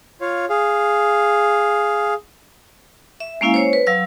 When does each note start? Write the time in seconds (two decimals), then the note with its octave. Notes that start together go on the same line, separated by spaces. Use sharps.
0.21 F4 C#5 F5
0.50 G#4 F5
3.20 E5
3.41 G#3 A#3 C#4 E4 F5 G#5
3.54 C5 C#5
3.73 B4
3.87 F#3 F5 E6